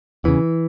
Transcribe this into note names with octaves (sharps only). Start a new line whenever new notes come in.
E2 C#3 E3